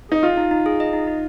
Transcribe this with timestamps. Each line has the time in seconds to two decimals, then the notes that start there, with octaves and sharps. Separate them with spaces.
0.09 D#4 G#4
0.22 F4 D#5
0.37 D#4
0.51 D#4
0.66 G#4
0.80 D#5
0.93 D#4
1.07 D#4